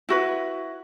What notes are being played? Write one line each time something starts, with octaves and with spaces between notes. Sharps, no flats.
E4 F#4 B4